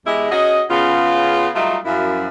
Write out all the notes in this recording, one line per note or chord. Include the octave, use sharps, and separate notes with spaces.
E2 G#3 E4 G4 G#4 D#5
C#4 F#4 G#4 D#5
C#3 B3 F4
F#3 G3 A3 D#4 F4
F#2 F3 E4